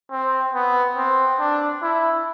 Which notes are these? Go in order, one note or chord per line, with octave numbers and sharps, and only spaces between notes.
C4
B3
C4
D4
E4